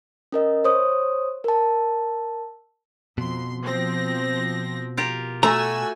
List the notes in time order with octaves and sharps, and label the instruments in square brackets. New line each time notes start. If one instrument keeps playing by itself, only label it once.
[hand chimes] C#4 A#4 D#5
C5 C#5 D#6
A#4 A5
[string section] F2 C6 [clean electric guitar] B2
[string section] F3 C4 A#6
[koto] F4 G4 A#4
[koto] A3 [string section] F#4 G#5 E6 [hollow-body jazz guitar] A#5